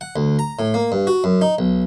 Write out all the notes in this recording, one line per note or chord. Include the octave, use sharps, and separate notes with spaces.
F#5
D2
A#5
A2
A#3
G2
F#4
F#2
D#4
B1